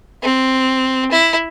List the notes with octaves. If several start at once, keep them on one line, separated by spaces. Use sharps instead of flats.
C4
E4